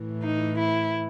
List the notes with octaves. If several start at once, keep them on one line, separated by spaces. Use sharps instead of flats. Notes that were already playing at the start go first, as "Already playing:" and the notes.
Already playing: A2 E3
D#4
E4